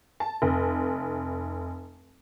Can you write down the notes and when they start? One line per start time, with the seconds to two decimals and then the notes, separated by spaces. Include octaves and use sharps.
0.20 A5
0.42 F1